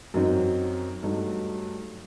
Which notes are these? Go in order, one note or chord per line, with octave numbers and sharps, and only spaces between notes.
F#2 F#3 C4 D#4
G2 F#3 A3 D#4